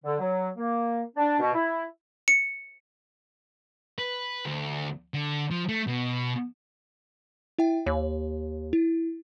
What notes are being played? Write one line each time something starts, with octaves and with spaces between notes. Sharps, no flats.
D3
F#3
A#3
D4
B2
E4
C#7
B4
D2
D3
F3
A3
B2
E4 E5 G5
D#2 C#5
E4